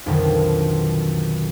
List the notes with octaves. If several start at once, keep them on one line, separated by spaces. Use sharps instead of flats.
B1 F2 B2 D3 D#3